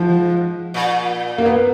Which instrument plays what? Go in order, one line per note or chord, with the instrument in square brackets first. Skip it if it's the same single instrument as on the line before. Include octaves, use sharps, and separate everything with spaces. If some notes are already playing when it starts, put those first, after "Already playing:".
Already playing: [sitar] G#2 [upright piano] F3
[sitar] A#2
[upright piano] A#3
B3